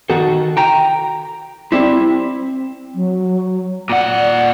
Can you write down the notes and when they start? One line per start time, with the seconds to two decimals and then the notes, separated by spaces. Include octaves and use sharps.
0.10 D#3 F#4 A4
0.57 G5 A#5
1.72 G3 C4 E4
2.36 C4
2.95 F#3
3.90 A#2 D5 F#5